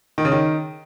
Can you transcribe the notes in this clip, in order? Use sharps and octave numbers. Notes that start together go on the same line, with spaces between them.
D#3
C#3
D#3